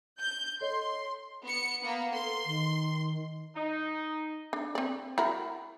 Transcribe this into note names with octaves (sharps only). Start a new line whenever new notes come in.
G6
A4 C#5 D#5 C6
B3 C#7
A#3 B3
A4 C6
D#3
D#4
D4
C4 D5
E4 F#4 A#4